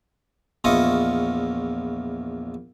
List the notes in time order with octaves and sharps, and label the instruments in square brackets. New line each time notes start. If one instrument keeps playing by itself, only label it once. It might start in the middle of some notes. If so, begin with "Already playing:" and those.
[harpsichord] A#1 E2 E4 F4 D#5 C#6